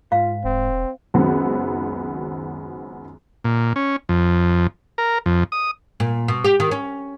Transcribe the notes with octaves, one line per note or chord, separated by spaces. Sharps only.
G#2 F4 F5
E1 C4
C#2 F#2 D#3 F#3 B3 C4
A#2
C#4
F2
A#4
F2
D#6
A#2
B2
G4
D#3
C#4